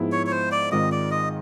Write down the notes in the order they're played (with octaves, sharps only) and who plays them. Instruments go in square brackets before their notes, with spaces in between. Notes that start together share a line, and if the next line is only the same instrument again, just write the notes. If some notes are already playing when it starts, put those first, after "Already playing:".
Already playing: [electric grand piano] G#2 F3 G#3 B3 E4
[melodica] C#5
C#5
C5
D5
[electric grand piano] G#2 D#3 G#3 C4 F4 [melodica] D#5
[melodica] D5
D#5